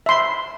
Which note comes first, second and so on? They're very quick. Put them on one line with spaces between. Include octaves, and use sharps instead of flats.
E5 C6 B5